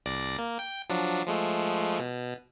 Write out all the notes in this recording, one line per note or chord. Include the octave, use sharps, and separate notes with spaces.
C2 D5 A#6
A#3
G5
F3 F#3 D4
F3 G#3 A3
B2